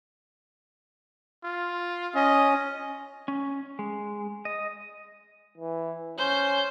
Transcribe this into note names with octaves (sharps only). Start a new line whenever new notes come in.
F4
C#4 D#5
C#4
G#3
D#5
E3
C#4 C5 G6